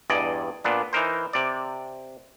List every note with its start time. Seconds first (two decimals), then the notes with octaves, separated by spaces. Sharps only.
0.10 E2 G2 D5 D#5 G#5
0.65 A#2 B3 D4
0.93 E3 D#4 A#4 C5
1.33 C3 D5